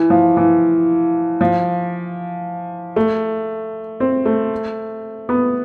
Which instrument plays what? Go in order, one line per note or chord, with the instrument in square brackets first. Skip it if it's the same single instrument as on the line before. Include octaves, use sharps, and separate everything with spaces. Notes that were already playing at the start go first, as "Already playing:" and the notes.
Already playing: [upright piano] E3
F3
E3
F3
A3
C4
A3
B3